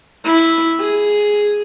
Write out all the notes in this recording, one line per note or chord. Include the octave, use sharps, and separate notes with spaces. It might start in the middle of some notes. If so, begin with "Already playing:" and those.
E4
G#4